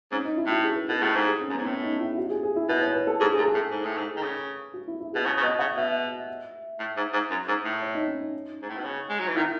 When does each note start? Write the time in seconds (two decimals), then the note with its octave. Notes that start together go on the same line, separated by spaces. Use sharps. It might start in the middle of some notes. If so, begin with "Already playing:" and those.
0.12 G#2 C#4
0.25 D#4
0.37 E4
0.46 A2 F#4
0.64 G#4
0.76 B4
0.89 B2 A4
1.01 A2 G#4
1.15 G#2
1.28 G#4
1.41 C#4
1.50 F#2
1.54 B3
1.58 G#2
1.66 A2 C#4
1.83 D#4
2.00 E4
2.18 F#4
2.30 G#4
2.43 G#4
2.56 E4
2.69 B2 B4
2.82 C#5
2.95 B4
3.07 A4
3.20 G#2 G#4
3.33 G#4
3.37 F#2
3.40 A4
3.46 G#4
3.54 A2
3.71 G#2
3.85 A2
3.98 G#2
4.17 D#3
4.23 C#3
4.74 F#4
4.88 E4
5.00 E4
5.13 B2 G#4
5.25 C#3 C#5
5.37 C#3
5.43 B2 D#5
5.59 C#3 F#5
5.77 B2 E5
6.79 A2
6.97 G#2
7.13 G#2
7.30 F#2
7.48 G#2
7.65 A2
7.82 C#5
7.94 D#4
8.08 C#4
8.21 D#4
8.62 G#2
8.69 A2
8.78 B2
8.84 C#3
9.10 G#3
9.19 F#3
9.28 E3
9.36 D#3 E4